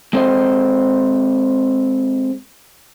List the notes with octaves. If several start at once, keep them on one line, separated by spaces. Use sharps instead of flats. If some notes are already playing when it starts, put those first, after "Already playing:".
G#3 C4 A4 C5 D#5